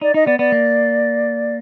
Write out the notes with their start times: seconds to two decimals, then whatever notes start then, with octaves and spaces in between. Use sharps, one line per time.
0.01 D#4 D5
0.14 D#4 D#5
0.27 B3 D5
0.39 B3 D5
0.52 A#3